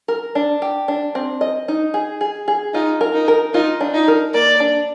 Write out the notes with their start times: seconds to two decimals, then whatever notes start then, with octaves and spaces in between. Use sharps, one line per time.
0.08 A#4
0.35 D4
0.62 G4
0.88 D4
1.15 C4
1.41 D#5
1.68 D#4
1.94 G#4
2.21 G#4
2.48 G#4
2.74 D#4 F4
3.01 A#4
3.14 D#4
3.28 A#4
3.54 D#4 F4
3.81 D4
3.94 D#4
4.08 A#4
4.34 A#3 D5
4.60 D4